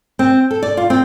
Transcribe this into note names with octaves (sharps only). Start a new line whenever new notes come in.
C4
A4
D5
F4
C4